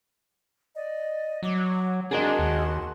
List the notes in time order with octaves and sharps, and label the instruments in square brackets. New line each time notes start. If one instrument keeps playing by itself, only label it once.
[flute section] D5 D#5
[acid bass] F#3 [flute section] D6
[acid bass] D4 [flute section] F#4 A5 C6 [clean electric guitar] G#4 A#4 D#5
[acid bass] D#2